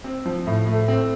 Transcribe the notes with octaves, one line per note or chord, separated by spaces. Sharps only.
C4
F3
A2
A3
C4